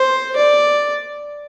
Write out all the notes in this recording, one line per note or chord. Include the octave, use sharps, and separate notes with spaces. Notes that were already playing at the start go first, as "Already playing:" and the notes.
Already playing: C5
D5